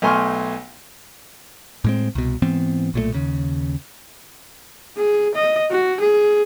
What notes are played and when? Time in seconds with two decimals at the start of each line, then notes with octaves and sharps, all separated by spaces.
0.02 B1 A3 G#5 C6 C#6 F6
1.84 A2 G#3 C4
2.15 C2 B2
2.42 G#2 E3 B3 C4
2.94 B1 A#2 F#3 A3
3.14 D#2 C#3
4.98 G#4
5.35 D#5
5.71 F#4
6.01 G#4